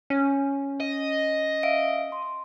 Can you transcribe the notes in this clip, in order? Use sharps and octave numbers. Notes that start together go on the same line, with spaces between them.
C#4 C#5
D#5
E5 F5 D7
C6